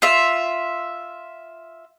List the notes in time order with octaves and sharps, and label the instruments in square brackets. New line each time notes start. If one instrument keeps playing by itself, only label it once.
[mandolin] F4 E5